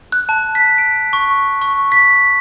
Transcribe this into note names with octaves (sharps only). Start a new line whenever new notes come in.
F#6
A5
B6
D7
C#6
C#6
B6